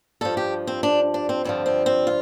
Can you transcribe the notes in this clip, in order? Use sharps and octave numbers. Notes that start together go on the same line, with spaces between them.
G2 F3 A4
G4
C4
D4
D4
C4
G2 D3 F3 C4
C4
C4
F4